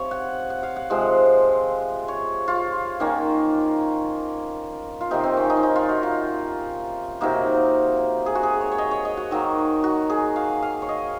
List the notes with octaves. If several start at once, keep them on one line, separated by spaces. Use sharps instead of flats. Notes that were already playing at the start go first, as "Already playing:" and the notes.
Already playing: C3 F3 C#5
F#5
F#5
F5
F#5
C3 F3 G#3
C#5
F4
D#3 A#3 C#4
F4
C3 D#3 A#3 D#4
C4
C#4
D#4
C#4
D#4
F4
F#4
F4
C3 F#3 A#3 D#4
G#4
F#4
G#4
C#5
C#5
D#5
C#5
D#5
F#4
D#3 F#3 A#3
F#4
G#4
F5
F5
C#5
D#5